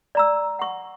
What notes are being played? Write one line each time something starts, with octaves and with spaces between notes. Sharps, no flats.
D5 A#5 E6
F#5 C#6